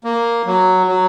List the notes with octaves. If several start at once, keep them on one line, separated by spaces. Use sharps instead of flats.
A#3
F#3
F#3